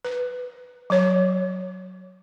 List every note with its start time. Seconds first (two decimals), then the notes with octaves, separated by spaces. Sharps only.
0.05 B4
0.90 F#3 C#5